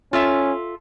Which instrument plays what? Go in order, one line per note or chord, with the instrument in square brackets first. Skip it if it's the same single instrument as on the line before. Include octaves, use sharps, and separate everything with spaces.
[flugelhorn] C#4 [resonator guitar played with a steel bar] F4 A4 E5